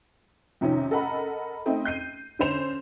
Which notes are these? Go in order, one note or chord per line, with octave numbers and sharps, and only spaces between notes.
F2 C3 D#3 F3 C#4 D#4
A4 A#4 D#5 F#5 A#5 B5
A3 C4 D#4 D#5
G6 C7 D#7
D3 C#4 C5 E7 F7